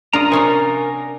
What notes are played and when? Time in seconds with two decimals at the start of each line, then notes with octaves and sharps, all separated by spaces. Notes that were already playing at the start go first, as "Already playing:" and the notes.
0.13 D4 F4 A#4 A#5 D#6
0.32 C3 C#4 A#4 F5 G#5